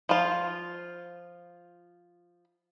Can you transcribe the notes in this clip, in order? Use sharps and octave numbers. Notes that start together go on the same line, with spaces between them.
F3 F4